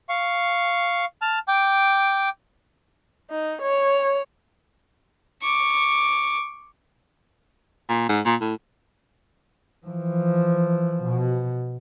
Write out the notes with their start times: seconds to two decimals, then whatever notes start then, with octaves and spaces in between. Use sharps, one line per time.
0.09 F5 C#6
1.22 A5 F6
1.48 G5 D6
3.31 D#4
3.62 C#5
5.42 C#6 D6
7.89 A#2
8.09 G#2
8.25 A#2
8.41 A2
9.86 E3 F3
11.03 B2